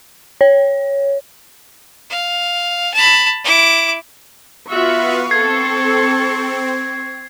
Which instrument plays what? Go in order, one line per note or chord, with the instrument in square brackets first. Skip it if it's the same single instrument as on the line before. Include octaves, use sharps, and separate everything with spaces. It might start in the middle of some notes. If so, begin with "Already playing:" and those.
[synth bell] C#5
[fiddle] F5
A5 B5
E4 D6
[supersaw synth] B3 B4 F5 [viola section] F4 F#4 E5 [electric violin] C#6
[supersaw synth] C4 [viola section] A4 [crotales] G#6 C7